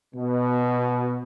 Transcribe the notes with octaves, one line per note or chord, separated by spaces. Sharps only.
B2